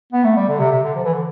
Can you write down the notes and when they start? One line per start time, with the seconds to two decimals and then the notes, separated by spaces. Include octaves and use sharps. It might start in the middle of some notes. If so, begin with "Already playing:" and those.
0.13 B3
0.24 A3
0.36 G3
0.48 D3
0.60 C3
0.71 C3
0.83 D3
0.96 F3
1.04 E3
1.13 D3